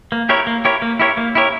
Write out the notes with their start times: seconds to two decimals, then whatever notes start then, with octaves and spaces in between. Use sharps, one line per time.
0.12 A#3
0.29 E4 G4 A#4 C#5
0.47 A#3
0.65 E4 G4 A#4 C#5
0.82 A#3
1.00 E4 G4 A#4 C#5
1.17 A#3
1.35 E4 G4 A#4 C#5